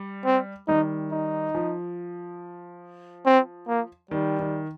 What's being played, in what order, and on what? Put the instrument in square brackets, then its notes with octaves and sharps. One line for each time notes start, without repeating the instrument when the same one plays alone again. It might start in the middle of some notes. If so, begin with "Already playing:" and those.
Already playing: [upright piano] G3
[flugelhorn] C4
[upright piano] D#3 G3 [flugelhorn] D#4
[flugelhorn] D#4
[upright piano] F3
[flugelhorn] C4
A#3
[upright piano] D#3 [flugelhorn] G3
[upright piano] D#3